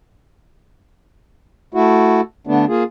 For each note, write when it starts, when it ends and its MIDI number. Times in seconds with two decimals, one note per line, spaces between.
1.74 2.21 57
1.74 2.21 64
1.74 2.21 66
2.47 2.65 50
2.47 2.65 57
2.47 2.65 59
2.47 2.65 62
2.68 2.84 58
2.68 2.84 65
2.68 2.84 68